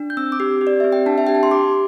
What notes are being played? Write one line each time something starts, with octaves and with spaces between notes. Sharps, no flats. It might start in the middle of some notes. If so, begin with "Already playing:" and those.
Already playing: D4
G6
C4 E6
D6
G4
G4
D5
C4 E5
G5
D4 A5
E5
G4 G5
A5
C6
G4 D6